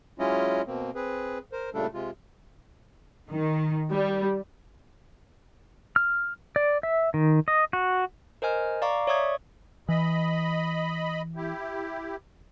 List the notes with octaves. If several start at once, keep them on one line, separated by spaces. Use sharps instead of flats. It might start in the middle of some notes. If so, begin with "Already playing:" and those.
F#3 G#3 C#4 E4 F4 D#5
B2 A#3 C4
C4 G#4 B4
A#4 C5
A#2 C#3 G3 A3 D4 A4
C3 G#3 F4
D#3
G3
F6
D5
E5
D#3
D#5
F#4
A#4 C5 D#5 G#5 F6
D5 F5 A#5 C#6 D6
C#5 D5 E5 C#6 D#6 G#6
E3 D#5 B5
E4 G4